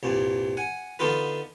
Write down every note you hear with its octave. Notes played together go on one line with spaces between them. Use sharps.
C2 G2 A#2
F#5 G#5
D3 B3 D4 D#4 F4 B4